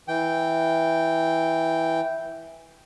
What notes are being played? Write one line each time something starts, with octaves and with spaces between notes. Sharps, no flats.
E3 G5